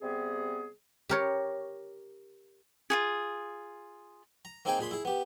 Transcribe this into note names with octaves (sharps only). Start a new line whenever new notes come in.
C3 G3 B3 C4 G#4
G4 A#4 C#5
F4 F#4 G#4
A#5
A#3 C4 D#4 G#4 G5 G#5
A#2 G#4 B5 C6
E4 G#4
B3 G4